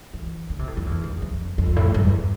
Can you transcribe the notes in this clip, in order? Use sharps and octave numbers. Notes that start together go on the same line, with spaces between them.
E3
D3
C3
A2
F2
E2
E2
F2
F2
A2
G2
E2